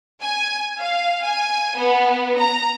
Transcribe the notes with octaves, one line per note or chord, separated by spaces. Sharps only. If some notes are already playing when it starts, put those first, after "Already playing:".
G#5
F5
G#5
B3
A#5